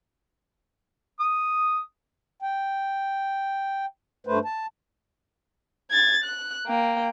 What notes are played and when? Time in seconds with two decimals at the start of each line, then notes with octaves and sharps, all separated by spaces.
1.20 D#6
2.42 G5
4.27 G2 A3 B4 C5
4.45 A5
5.91 G#6 A6
6.24 F#6
6.66 A#3 G5